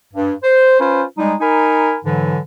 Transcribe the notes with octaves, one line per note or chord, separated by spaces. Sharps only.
G2
C5
C#4 F4 B4 C5
G3 G#3 D#4
D#4 A#4 G#5 B5
G#2 D3 E3 F#3